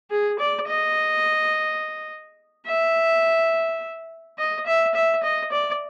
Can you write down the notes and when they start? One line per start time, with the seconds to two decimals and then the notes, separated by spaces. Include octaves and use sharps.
0.11 G#4
0.39 D5
0.68 D#5
2.67 E5
4.39 D#5
4.66 E5
4.94 E5
5.23 D#5
5.52 D5